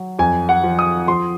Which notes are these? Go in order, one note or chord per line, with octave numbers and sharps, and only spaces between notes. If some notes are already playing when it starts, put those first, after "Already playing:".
Already playing: F#3
F2 G#5
F#5
F3
D#6
F3 C6